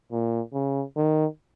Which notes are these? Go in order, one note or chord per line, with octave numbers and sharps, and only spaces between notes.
A#2
C#3
D#3